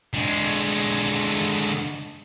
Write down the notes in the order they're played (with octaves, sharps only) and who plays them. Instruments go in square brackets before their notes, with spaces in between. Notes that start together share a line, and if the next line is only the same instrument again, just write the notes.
[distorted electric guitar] D3 G#3